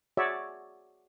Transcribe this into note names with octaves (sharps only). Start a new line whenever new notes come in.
F#4 G#4 C#5 D5 E5